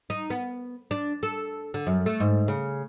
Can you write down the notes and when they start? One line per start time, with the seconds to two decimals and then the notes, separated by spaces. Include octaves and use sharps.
0.10 D#4
0.30 B3
0.91 D4
1.23 A4
1.74 D3
1.87 F#2
2.06 A3
2.20 G#2
2.48 C#3